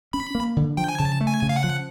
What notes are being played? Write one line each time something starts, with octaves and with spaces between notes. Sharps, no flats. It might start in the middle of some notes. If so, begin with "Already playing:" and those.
C#4 B5
A#3
D3
F3 G5
G#5
C#3 A5
A3
G#5
C#3
F5
F#5
F3